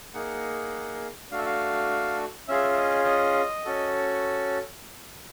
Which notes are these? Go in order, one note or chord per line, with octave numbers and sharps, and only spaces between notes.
A#3 D#4 G#4 F#5
A3 D4 F#4 F5
E5
F5
C#4 F4 G#4 E5
E5
D#5
D#5
C#4 F#4 A4